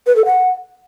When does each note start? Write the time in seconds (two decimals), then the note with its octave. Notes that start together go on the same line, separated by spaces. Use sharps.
0.07 B4
0.16 A4
0.25 F#5